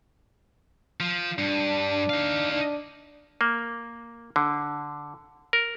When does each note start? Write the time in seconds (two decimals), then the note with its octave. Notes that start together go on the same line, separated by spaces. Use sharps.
1.00 F3
1.38 G2 D4
2.09 D#4 F5
2.52 D4
3.41 A#3
4.36 D3
5.53 A#4